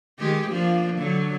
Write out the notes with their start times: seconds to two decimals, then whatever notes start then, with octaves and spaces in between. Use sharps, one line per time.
0.19 D#3 G#3 G4
0.49 F3 A#3 D4
0.99 D3 F#3